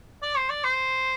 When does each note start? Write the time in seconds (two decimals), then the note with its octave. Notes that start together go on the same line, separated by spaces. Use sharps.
0.23 D5
0.37 C5
0.50 D5
0.64 C5